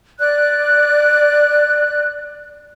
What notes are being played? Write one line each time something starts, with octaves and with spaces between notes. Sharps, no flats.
D5 F#6